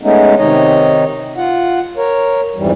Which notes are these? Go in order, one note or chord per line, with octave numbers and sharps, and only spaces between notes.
G#3 A3 B3 C#4 D#4
C3 D#3 D#4 C#5 D#5
F4 F#5
A#4 C#5
F2 G#2 E3 G3